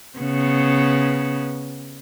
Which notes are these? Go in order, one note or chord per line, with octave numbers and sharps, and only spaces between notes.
C#3 B3